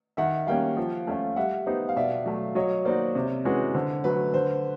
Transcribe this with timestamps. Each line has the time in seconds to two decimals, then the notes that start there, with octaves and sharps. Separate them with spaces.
0.17 D#3 E5 F#5
0.47 G3 A#3 C#4 F5 G5
0.77 F3
1.07 A3 C#4 F4
1.36 G3 E5 F#5
1.67 B3 D#4 G4 C5
1.89 F5
1.96 B2 D5 E5
2.26 F#3 A3
2.55 F#3 C#5 D#5
2.85 A#3 D#4 F#4 C5 D5
3.15 C3
3.45 E3 G#3 C#4 F#4
3.74 D3 C5
4.04 F#3 A3 B4
4.34 D3 C5